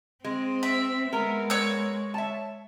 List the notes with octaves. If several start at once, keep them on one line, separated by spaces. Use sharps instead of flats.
G#3 C4
E5
G#3 B3 A#4
C#5 E6
E5 A5